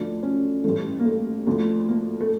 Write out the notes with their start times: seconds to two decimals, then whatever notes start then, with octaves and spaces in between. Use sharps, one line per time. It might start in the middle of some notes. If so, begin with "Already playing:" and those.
Already playing: D2 D3 F3 D4
0.23 C#4
0.64 A1 G2 E3 A3
1.00 A#3
1.05 A3
1.47 D2 D3 F3 A3
1.88 A#3
2.21 A3